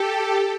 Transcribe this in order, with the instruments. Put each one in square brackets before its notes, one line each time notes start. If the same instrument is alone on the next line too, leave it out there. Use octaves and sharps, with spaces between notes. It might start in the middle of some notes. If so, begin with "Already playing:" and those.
Already playing: [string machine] G4 A4